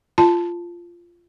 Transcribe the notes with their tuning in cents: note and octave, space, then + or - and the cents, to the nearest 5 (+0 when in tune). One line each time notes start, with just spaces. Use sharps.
F4 -10 A5 +0